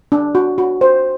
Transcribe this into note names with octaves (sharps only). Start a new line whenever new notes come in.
D4
F#4
F#4
C5